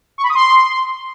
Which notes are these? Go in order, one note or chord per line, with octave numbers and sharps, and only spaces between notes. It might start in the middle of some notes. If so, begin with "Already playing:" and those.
C#6
B5
D#6
C6